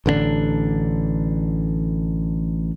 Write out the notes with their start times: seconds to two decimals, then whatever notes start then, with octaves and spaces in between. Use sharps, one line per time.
0.06 A1 D3 B3 D4